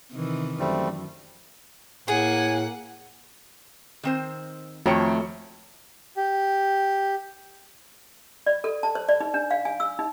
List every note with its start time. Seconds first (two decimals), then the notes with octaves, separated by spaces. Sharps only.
0.12 C3 D#3 E3
0.60 F#2 G3 A3 C4
2.08 A2 A#3 G#4 F#5 G#5
4.03 D#3 C4 C5
4.86 F2 D#3 A3 F#4 C#5 G5 A#5 C#7
6.17 G4
8.46 D5
8.64 A4
8.83 A5
8.95 C5
9.09 D5
9.21 D#4
9.34 D4
9.51 F5
9.65 G#5
9.80 E6
9.99 D#4